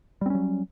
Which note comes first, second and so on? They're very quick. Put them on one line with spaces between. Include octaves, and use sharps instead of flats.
G3 C4 C#4 F#3